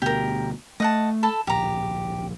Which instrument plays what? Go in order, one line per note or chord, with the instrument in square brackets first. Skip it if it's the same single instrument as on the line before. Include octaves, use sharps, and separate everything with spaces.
[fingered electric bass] D2 B2 [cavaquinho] G4 A#4
[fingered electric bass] A3 [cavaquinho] D#5 F#5 A5
[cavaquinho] A4 A5 B5
[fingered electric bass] D1 A#1 [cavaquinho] G4 A#5